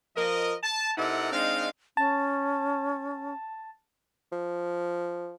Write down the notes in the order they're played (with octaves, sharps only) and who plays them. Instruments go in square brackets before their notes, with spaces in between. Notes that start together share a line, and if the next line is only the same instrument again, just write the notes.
[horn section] F3 A#4 D#5
A5
C3 D#4 E4 A4 A#4 F#5
G#3 C4 D4 D#4 F5
[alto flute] C#4 [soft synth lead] A5
[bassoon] F3